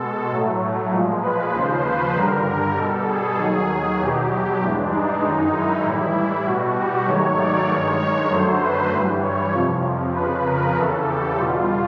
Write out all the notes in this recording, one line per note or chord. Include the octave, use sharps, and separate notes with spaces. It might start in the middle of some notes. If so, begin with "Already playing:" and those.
Already playing: B2 G#3 A4
A2 F#3 A3
A#2 F3 G#3
B4
D#2 C#3 F3 C5
B4
G2 D3 G3 A#4
A#4
B2 G3 A4
G#4
D#2 D#3 F#3
G#4
E2 B2 F#3 G4
G2 E3 G#3 D4
D#4
F#2 D#3 G#3
E4
A2 E3 G3
E4
B2 G3 F#4
G4
G#2 D#3 F#3 A3 C#5
D5
G2 D#3 G#3 C#5
C#5
F#2 D3 F#3 A3 C5
B4
G2 E3 G3
C#5
F2 C3 F3
F2 C#3 F3 B4
A#4
E2 C#3 E3 A4
G4
E2 B2 G3 F4